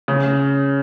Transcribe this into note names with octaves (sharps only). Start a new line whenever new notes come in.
C#3